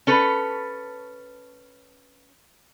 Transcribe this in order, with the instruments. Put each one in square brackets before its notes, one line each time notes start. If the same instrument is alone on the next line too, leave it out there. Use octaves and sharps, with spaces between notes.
[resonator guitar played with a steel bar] C#4 A4 B4